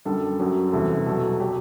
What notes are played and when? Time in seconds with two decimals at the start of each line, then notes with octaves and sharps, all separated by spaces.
0.05 F#2 D3 G3 A4
0.40 F#2 F#3
0.72 E2 C3 E3 G3 A4
1.06 B2 F#3 A4
1.40 F#3 G4